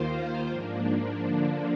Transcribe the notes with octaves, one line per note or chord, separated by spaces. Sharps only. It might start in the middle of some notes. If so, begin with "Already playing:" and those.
Already playing: D#2 D#3 A#3 F4 C5
G#2 F3 A#3 D4
D3 F3 A#3 D4